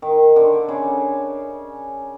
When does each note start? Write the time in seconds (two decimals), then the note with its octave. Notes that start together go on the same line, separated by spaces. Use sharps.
0.02 D#3
0.36 D3
0.69 C#3